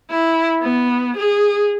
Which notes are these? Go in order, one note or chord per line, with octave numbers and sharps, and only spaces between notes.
E4
B3
G#4